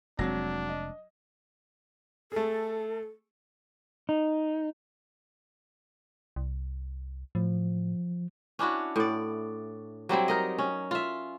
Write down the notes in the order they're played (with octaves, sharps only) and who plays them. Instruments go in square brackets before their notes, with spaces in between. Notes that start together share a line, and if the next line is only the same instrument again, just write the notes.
[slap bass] F1 G#3 C4 [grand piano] F#3 A#6 [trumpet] D4
[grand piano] D#5
[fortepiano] A3 G#4 [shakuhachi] A4
[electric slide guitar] D#4
[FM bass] C2
[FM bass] A2 [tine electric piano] F3
[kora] C#4 D4 E4 F#4
A2 D5
F#3 G3 C4 E4
D#4 A#4 D#5
C#4
F4 E5